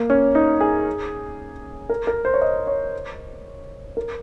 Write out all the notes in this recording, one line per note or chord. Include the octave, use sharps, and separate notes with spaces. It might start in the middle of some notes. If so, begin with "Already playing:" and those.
Already playing: A#3
C#4
D#4
G#4
A#4
A#4
C5
C#5
D#5
C#5
A#4